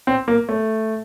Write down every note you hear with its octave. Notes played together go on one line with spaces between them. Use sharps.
C4
A#3
A3